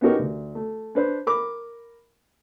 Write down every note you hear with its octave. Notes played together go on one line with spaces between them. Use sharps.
B3 C#4 D#4 F#4 G4 A#4
D2
A3
D4 B4 C5
A#4 B5 D6